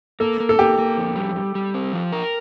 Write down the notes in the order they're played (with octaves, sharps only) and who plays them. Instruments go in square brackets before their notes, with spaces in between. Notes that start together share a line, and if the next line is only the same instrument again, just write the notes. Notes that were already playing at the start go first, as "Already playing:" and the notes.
[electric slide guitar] A#3 [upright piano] A4
[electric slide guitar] A#3
[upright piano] A4
[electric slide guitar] A#3 [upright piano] G4
[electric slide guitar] A#3
F2
G3
G3
G3
C4
F3
A#4